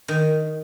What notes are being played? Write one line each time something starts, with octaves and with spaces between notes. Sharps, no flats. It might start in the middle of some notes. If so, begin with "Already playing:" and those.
D#3